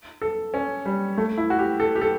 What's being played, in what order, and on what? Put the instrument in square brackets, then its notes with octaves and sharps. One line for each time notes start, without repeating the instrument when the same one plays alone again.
[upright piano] A4
C#4
G3
A3
E4
F#4
G4
A4
G4
A4